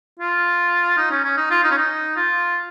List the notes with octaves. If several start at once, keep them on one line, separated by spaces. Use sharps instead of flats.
F4
D#4
C#4
C#4
D#4
F4
D#4
C#4
D#4
F4